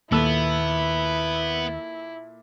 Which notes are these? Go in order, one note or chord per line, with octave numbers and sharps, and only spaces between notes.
D#2 A#2 B3 E4 A4 E6